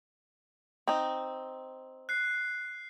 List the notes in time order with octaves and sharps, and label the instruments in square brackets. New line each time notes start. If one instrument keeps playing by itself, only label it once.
[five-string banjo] C4 D#4
[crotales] F#6 C7